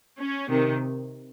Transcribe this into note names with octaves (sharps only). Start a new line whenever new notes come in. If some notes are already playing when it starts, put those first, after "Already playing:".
C#4
C3 D#3